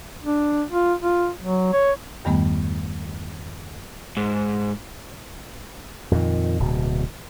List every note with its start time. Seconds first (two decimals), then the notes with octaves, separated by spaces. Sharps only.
0.23 D4
0.71 F4
1.02 F4
1.42 F#3
1.73 C#5
2.25 E2 G2 D#3 G3 A3 B3
4.17 G#2
6.11 F2 A#2 D3 D#3
6.60 D1 B2